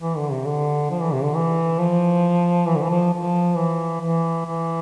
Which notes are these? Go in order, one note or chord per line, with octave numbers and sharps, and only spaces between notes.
E3
D3
C3
D3
F3
E3
C3
D3
E3
F3
E3
D3
E3
F3
F3
E3
E3
E3